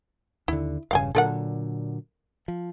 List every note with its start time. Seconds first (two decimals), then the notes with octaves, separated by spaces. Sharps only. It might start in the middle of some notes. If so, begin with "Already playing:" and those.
0.48 D#2 D3 E4
0.91 E1 G2 C#3 F5 G5 G#5
1.15 A#2 D3 F#3 A4 A#4 F#5
2.48 F3